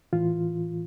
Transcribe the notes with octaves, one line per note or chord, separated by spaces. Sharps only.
A2 E3 F4